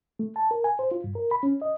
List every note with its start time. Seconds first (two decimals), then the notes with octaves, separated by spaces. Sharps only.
0.19 A3
0.36 A5
0.51 A#4
0.64 G#5
0.79 C5
0.91 F4
1.04 G2
1.15 A#4
1.31 B5
1.43 C#4
1.62 D#5